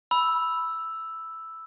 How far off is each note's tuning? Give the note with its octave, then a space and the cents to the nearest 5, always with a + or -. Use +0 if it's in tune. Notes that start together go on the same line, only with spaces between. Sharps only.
B5 +0 E6 +0